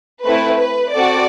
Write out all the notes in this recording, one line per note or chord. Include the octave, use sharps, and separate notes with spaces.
A3 C4 E4 B4
B4
C4 F#4 A4 D5